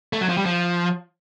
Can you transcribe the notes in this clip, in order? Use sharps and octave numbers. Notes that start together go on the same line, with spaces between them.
A3
F#3
F3
G3
F3